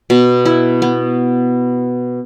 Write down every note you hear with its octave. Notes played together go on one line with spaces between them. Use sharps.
B2
E4
B3